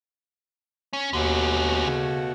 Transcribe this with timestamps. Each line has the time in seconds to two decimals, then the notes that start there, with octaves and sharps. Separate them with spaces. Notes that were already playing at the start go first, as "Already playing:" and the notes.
0.93 C#4
1.13 D#2 B2 D3 A3 C#4 F#4
1.86 C#3